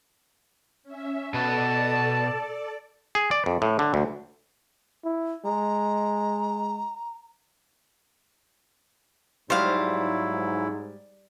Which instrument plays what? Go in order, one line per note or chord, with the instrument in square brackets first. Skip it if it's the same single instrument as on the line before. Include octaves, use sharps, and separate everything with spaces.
[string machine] C#4 E5
[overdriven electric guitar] B2 B4 [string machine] A4 D5 [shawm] A5
[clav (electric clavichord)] G#4
D5
F2
A2
D3
D2
[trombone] E4
[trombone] G#3 [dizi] A#5
[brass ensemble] G#2 [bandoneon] F#3 E4 [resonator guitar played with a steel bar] G3 [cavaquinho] C5 F5